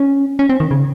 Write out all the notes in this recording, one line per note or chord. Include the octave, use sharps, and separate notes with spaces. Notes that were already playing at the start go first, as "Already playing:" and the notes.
Already playing: C#4
C#4
C4
D#3
C#3